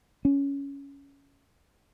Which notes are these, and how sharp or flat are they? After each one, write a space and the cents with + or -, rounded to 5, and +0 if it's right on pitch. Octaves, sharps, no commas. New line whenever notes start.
C#4 +10